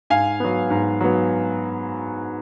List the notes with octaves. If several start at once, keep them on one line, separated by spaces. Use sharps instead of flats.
G#2 F5 G#5
F#3 B3
G#2
F#3 B3